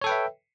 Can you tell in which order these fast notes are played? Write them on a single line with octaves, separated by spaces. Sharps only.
C#5 A4 G5 B4 E5